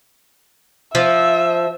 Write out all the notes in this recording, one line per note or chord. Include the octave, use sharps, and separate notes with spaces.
F3 E5